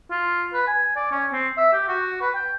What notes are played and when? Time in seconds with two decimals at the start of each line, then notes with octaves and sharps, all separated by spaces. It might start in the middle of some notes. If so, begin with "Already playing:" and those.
0.11 F4
0.54 B4
0.67 G#5
0.96 D5
1.11 C#4
1.32 C4
1.57 E5
1.73 G4
1.88 F#4
2.21 B4
2.35 G5